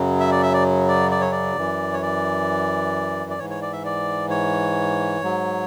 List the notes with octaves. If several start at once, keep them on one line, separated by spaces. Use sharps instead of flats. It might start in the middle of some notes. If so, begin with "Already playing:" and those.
Already playing: F#2 C#3 F#3
E5
D5
E5
D5
D5
D5
C#5
D5
F#2 E3
C#5
D5
D5
G#2 E3 C#5
C#5
D5
E5
D5
C#5
G#2 F#3